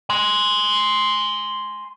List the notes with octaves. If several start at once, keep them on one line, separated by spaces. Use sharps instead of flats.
G#5 C6